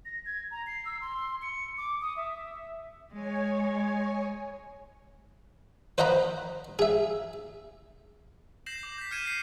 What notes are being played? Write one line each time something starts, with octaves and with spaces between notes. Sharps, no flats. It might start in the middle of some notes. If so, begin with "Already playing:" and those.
A#6
G#6
A#5
C7
E6
C6
C#7
D6
D#6
E5
G#3 C#5 G#5
B4 C5 D#5 F#5 A#5 B5
G#4 E5
G6 A#6 C7 E7 F#7
D6
G6 B6
F6 G6 G#6 C#7 D#7 E7
G6 B6 C7